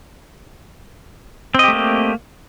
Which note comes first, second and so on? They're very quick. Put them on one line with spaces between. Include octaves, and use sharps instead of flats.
C4 D#5 G4 A3 A#3